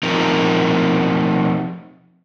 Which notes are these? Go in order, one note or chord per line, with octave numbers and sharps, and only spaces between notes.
F3 C4 D#4 A#4